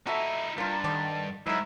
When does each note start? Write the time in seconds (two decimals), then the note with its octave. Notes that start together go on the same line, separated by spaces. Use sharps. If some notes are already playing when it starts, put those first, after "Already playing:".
0.07 D#4 E4 F#4 A4 E5
0.58 G2 A#3 F4 A#4 A5
0.84 D3 D#3 D5
1.47 G#2 F#3 D#4 E4 A#4